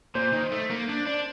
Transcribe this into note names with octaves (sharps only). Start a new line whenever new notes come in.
A#2 C5
D#3
A3
A#3
D4
D4